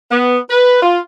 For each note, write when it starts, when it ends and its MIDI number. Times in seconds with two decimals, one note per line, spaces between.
0.11 0.38 59
0.50 0.79 71
0.82 0.99 65